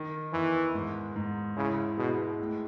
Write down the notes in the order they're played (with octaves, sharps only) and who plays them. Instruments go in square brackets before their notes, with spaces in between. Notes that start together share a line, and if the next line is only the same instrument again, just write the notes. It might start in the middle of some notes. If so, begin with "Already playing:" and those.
Already playing: [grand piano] D#3
[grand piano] E2 [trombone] E3
[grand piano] G#2
G#2
[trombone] C#3 [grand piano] E4
[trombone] B2 [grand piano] G#3
[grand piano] A2